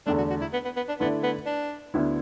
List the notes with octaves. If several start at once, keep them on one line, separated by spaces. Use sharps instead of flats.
E2 D3 A3 D4
F#4
F#4
E4
B3
B3
B3
D4
D3 A3 B3 E4 D5
B3
D4
D2 D3 B3 E4